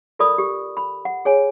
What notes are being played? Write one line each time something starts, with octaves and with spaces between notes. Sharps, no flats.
F4 A4 A#4 D5 B5 D#6
G4
B5
F#5
G#4 C#5 G#5